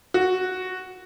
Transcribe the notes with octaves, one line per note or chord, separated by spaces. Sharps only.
F#4